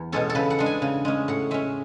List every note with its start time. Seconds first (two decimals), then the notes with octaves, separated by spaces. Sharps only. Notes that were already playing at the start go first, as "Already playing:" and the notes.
Already playing: E2
0.12 B2 G#3 C#4 A4
0.30 A4
0.35 C#3 B4
0.50 F#5
0.59 G#3 D4
0.66 G#5
0.82 C#3
1.05 G#3 C#4
1.28 A2 F#5
1.51 G#3 C#4 E5